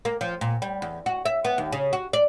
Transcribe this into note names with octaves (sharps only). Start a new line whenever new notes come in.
A#3
F3
A#2
G3
E2
F#4
E5
B3
D#2
C#3
F#4
D5